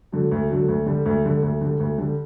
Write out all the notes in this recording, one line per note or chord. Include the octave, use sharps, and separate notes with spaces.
D3 F#3
D2
D3 F#3
D2
D3 G3
D2
D3 G3
D2
D3 G3
D2
D3 G3